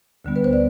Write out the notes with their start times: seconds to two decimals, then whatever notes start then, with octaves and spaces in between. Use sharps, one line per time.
0.25 D2 D3 G3 B3
0.36 B4
0.44 C5
0.53 D5